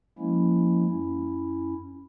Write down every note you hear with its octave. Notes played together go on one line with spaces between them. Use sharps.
F3 G#3 A#3 C#4 E4
F#2 C#4 E4